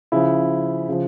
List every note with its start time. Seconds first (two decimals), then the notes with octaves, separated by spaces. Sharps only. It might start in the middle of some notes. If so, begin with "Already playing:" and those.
0.12 C#3 F3 E4
0.88 C#3 F3